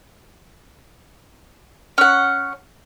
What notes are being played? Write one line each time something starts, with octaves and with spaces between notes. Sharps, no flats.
C#4 F#5